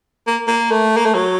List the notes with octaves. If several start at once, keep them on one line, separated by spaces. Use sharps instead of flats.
A#3
A#3
A3
A#3
A3
F#3